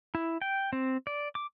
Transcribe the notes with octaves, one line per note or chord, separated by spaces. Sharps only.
E4
G5
C4
D5
D6